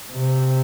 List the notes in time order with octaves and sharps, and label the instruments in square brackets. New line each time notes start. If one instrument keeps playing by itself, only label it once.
[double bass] C3